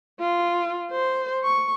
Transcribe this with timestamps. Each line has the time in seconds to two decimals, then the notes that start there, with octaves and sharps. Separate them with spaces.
0.20 F4
0.91 C5
1.44 C#6